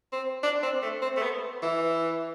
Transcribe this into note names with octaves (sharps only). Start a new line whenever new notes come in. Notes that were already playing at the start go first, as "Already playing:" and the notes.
C4
D4
C4
A3
C4
A3
B3
E3